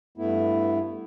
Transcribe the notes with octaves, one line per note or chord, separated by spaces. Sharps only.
G2 A3 B3 E4